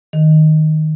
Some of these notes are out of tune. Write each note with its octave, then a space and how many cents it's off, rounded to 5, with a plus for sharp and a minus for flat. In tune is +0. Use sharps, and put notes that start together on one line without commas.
D#3 +0